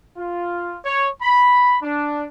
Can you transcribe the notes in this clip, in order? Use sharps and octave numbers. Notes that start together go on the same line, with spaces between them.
F4
C#5
B5
D4